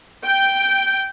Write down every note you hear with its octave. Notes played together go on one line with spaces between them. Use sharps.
G5